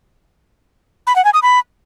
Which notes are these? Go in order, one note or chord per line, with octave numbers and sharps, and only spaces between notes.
B5
F#5
G#5
D#6
B5